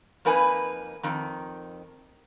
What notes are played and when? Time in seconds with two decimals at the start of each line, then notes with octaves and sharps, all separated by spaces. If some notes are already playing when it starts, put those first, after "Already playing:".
0.25 F2 A#3 D#4 B4 G#5
1.03 F2 D#3